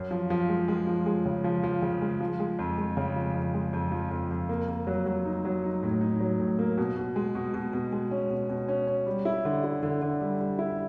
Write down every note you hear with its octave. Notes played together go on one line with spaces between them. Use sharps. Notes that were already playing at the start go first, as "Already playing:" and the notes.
Already playing: F#2
F3
F3
G#3
G#3
F3
G#3
C#3
F3
F3
C#3
G#3
F3
G#3
F2
G#3
C#3
F3
F2
G#3
F2
F3
F2
F2
A#3
A#3
F#3
F#3
D#4
F#3
D#4
A2
D#4
F#3
A2
A#3
B2
B2
G#3
B2
B2
B2
G#3
C#4
B2
B2
C#4
C#4
G3
E4
D3
E4
D3
D3
G3
G3
E4